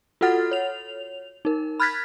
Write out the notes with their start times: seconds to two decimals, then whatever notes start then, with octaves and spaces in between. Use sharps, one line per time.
0.21 F4 F#4 A4 F#5 F6 A6
0.51 C#5 F7
1.45 D#4 A#4
1.80 B5 F6 F#6 G#6 A6 B6